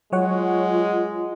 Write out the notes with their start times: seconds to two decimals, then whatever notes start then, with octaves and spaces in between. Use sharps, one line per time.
0.12 F#3 G#3 F4 C#5 F#5